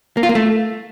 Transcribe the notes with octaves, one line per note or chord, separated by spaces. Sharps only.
A#3
F4
A#3
A3